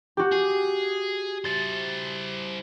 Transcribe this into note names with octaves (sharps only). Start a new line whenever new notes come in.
F#4 G4
G#4
E4 C5 A6